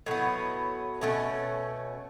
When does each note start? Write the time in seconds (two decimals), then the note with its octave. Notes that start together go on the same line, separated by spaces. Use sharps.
0.06 A2 F#3 B3
1.01 B2 A3 C#4